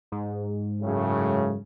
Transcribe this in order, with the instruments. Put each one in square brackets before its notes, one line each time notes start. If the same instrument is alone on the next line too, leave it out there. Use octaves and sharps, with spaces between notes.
[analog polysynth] G#2
[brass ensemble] F#2 A2 C#3